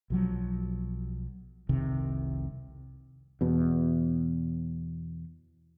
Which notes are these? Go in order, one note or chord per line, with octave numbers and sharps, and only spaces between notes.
B1 F3 F#3
F1 C2 C3 D#3
E2 B2